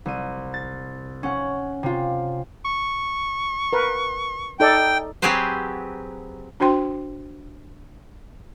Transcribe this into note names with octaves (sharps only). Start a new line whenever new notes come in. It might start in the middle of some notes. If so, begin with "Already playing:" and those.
C2 D#7
A6
C#4 F#5
C3 F4
C#6
A#4 B4
D#4 A4 D5 G5
F#3 C4 G4 G#4 B4 C5
D4 F#4 C5 G5 C6